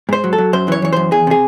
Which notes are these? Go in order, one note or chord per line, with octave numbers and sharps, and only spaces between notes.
G#2 C5
F#3
A4
F#3
F#2 C5
E3 C#5
E3 C#5
F#2 C5
E2 G#4
C3 G#4